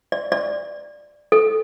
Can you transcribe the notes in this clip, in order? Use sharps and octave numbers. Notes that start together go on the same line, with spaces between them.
D5
D5
A4